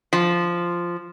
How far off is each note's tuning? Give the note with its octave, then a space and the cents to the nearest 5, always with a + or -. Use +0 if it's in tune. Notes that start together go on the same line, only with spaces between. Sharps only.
F3 -5